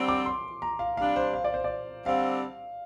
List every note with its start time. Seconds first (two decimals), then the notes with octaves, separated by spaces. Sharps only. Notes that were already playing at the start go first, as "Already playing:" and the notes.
Already playing: D3 G3 C4
0.08 D6
0.26 C6
0.62 A#5
0.79 F5
0.97 C3 G3 D4 F5
1.16 C5
1.34 F5
1.44 D5
1.54 C5
1.64 D5
2.06 D3 G3 C4 F5